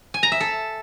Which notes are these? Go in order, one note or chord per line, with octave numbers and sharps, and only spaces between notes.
G#5
A#5
E5
A4